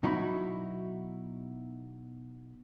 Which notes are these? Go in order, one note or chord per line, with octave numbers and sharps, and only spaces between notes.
B2 F#3 D#4 E4 F#4 B5